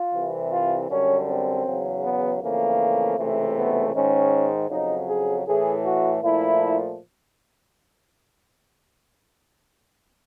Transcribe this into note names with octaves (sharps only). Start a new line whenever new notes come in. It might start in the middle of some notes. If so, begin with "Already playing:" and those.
Already playing: F4
C2 C3 E3
F4
F#2 D3 G3 C#4
C4
E2 C#3 F#3
B3
F2 C#3 E3 A3 A#3
C#2 C3 E3 A3
B3
G#2 D#3 G#3 C#4
F2 C#3 F#3 D#4
G#4
A2 E3 A3 G#4
F#4
A#2 F3 A3 E4